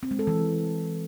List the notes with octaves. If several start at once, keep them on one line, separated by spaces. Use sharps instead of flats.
C4
G#3
A4
E3